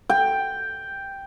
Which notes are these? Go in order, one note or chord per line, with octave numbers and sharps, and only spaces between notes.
G5